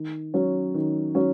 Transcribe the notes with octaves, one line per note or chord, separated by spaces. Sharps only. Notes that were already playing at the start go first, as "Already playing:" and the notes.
Already playing: D#3
F#3 C#4
D#3
F#3 C#4